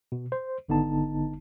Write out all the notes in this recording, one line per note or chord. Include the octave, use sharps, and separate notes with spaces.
B2
C5
G#1 D3 B3 D#4 A5